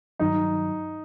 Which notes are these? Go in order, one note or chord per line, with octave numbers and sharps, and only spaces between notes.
G2 D#3 F#3 D#4